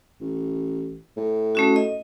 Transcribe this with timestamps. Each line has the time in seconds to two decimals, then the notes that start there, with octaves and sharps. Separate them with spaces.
0.21 A1
1.17 A2
1.55 A3 C#4 F#4
1.76 D#5